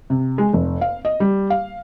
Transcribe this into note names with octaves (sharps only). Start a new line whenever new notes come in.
C3
G#3
F1
F5
D#5
G3
F5